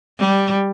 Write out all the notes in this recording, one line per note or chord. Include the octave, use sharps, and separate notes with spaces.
G3